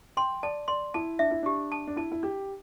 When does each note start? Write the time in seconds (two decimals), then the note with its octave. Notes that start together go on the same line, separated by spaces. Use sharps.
0.17 G5 C6
0.43 D5 A5
0.68 D5 C6
0.94 E4 A5
1.19 D4 E5
1.31 E4
1.43 D4 G4
1.72 A5
1.87 D4
1.96 E4 A5
2.12 E4
2.23 D4 G4